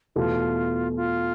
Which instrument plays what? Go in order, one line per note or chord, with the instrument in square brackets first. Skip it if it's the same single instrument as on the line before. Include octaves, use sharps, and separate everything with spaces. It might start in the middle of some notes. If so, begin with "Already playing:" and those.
[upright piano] E2 B2 A3 [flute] F4
[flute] F4